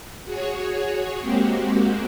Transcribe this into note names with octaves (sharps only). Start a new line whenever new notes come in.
F#4 G#4 C#5
G#3 A#3 C4 F#4 G4